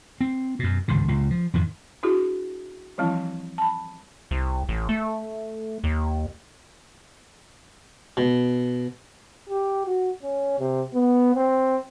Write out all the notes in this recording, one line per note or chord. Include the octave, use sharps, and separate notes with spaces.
C4
F#2 B2
G#1 C#2 G2 D3
C#2 A#2
F3
F2 G#2 D#3
D4 E4 F#4 G#4
E3 F3 G3 C4 E4
A5 B5
C2
A1
A3
D#2
B2
G4
F#4
C#4
C3
B3
C4